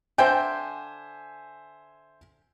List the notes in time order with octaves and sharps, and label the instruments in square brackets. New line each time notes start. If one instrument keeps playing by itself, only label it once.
[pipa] D3 G5 [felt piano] C5 E5 G#5